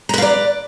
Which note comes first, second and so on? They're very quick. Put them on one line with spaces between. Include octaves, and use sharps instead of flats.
A#5 B4 F5 D5